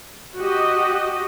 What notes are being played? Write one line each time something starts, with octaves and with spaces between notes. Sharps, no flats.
F#4 G4 D#5